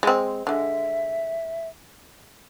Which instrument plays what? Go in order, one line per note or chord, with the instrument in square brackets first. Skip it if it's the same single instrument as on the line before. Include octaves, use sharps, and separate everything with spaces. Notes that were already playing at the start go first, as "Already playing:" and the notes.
[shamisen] G#3 C4
[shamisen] D3 G#3 [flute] E5